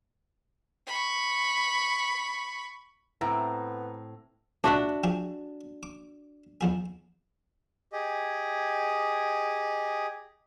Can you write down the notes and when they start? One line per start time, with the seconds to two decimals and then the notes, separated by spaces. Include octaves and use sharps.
0.86 B5 C#6
3.21 A2 B3 C4 A#5
4.64 C#2 A#2 D4 F#4 D#5 E5
5.04 F3 G4 G#4
5.83 D6
6.61 E2 F3 G#4
7.93 G4 G#4 D#5